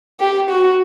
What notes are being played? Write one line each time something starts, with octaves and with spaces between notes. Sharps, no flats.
G4
F#4